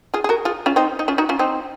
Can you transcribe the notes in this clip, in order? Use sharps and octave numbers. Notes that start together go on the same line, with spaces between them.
F4 G#4
G#4
F#4 A#4
F4 G#4
C#4 F4
C4 D#4
D#4
C#4 F4
D#4 F#4
C#4 F4
C4 D#4